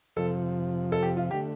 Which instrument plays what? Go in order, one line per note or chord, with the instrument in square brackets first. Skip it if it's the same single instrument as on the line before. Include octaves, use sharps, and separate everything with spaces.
[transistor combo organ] F2 C3 F3 [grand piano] A4
[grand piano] A4
G4
F4
[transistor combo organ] D3 A3 [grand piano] G4